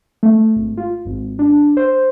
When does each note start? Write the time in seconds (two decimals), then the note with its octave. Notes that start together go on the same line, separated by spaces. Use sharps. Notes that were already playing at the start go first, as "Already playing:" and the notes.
0.23 A3
0.56 G#1
0.77 F4
1.05 G#1
1.39 D4
1.77 C5